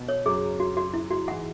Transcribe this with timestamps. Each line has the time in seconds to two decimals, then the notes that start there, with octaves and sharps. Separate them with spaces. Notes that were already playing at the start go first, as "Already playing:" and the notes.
Already playing: B2 B3
0.09 C#5
0.26 F#2 C#3 F#3 G#4
0.60 F#4
0.77 F#4
0.94 E4
1.11 F#4
1.28 G#2 E3 G#3 F#5